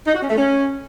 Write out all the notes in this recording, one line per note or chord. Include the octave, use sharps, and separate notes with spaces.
D#4
F#4
C#4
A3
C#4